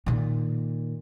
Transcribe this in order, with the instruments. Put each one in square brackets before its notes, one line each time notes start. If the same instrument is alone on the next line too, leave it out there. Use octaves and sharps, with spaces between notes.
[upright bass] A#2 D#3